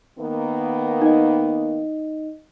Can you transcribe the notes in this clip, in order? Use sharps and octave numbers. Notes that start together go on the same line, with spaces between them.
D#3 A#3 B3
D#4 D#5